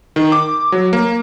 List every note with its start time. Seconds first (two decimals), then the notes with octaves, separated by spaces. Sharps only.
0.16 D#3
0.32 D6
0.72 F#3
0.93 A#3